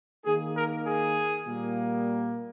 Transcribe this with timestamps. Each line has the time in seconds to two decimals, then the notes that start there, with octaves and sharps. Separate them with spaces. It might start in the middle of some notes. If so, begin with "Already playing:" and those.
0.24 D#3 A#3 G#4
0.55 A#4
0.85 G#4
1.45 A#2 G3 A#3